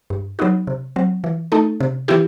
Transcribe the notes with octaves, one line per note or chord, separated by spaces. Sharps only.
G2
F#3 B3 D#4 F#4
C3
F#3 C4
E3
A3 D#4 A4
C3
E3 B3 E4 G4